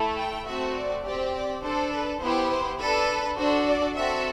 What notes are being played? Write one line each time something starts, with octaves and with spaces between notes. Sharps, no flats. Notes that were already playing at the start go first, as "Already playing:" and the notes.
Already playing: A3 E4 A4
G5
A3 C4 F#4 E5
D5
C4 G4 D5
D5
D4 A4 C5
B4
B3 E4 G4 C5
C5
D4 A4 B4
D4 F#4 A4 C5
D5
C4 F#4 A4 E5